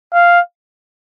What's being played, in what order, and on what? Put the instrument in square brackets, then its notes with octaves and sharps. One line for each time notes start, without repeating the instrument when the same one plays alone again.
[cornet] F5